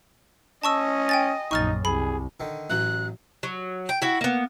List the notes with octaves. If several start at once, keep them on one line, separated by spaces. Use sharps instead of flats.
C#4 D#5 A5 C#6 E6
G5 G#5 A6
A#1 F#2 D#4 C#6 F6 A6
C2 G#4 B5
D3 D#3
A1 F#3 F#6
F#3
G5
E4 F#4
A#3 B3